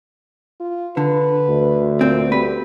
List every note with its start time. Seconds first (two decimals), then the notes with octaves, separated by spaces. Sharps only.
0.60 F4
0.97 D3 B4
1.48 D2
2.01 A#2 C4
2.32 G3 B4